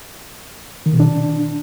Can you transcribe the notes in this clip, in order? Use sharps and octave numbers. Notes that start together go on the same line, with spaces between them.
D#3
B2
D4